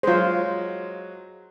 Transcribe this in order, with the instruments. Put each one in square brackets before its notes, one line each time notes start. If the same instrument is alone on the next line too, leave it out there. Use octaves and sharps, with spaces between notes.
[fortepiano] F#3 G#3 [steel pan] F4 C5